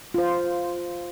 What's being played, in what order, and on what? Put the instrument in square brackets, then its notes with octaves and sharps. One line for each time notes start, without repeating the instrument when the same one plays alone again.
[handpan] F4 C5